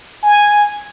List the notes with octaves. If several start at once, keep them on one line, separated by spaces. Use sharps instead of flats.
G#5